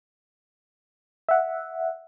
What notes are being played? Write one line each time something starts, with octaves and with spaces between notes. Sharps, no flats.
E5 F#5